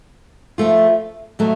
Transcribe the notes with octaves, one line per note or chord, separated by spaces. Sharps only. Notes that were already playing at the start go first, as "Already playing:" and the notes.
F3 A3 F4
B2 F#3 A3